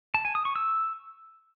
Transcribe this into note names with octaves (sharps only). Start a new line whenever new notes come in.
A5
G#5
D#6
C#6
E6